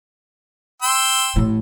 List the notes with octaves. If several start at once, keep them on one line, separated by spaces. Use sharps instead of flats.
G5 C6 E6
A1 A2